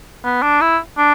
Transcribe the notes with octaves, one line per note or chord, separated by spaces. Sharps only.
B3
D4
E4
D4